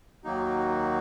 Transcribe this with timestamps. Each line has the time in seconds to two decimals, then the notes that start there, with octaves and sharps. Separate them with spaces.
0.24 D#2 D#3 F#3 A#3 D#4 F#4